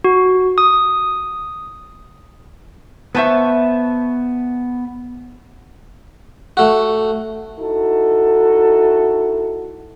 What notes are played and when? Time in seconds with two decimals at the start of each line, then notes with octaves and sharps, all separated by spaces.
0.04 F#4
0.58 D#6
3.15 B3 B4 C5 E5 A5 C#6
6.57 A3 F#4
7.59 D#4 E4 F#4 A4